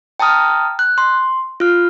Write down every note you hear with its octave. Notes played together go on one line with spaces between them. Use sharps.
G5 A5 A#5 D#6 F6
F#6
C6
F4 F6